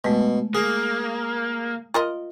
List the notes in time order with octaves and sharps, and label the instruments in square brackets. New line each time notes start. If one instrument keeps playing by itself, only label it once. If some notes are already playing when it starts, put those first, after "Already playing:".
[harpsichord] B2 [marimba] G#3 A3
[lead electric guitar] A#3 [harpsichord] G#4
[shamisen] F4 A#4 D#5